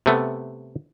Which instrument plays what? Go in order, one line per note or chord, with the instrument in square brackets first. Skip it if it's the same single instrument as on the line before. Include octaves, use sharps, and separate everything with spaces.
[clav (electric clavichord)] C3 A3 B3